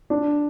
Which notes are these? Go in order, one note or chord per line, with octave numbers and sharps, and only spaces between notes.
D4